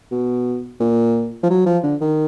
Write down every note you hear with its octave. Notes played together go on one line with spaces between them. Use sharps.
B2
A#2
F3
F#3
F3
D3
D#3